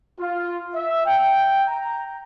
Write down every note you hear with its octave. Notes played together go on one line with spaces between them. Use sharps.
F4
E5
G5
A#5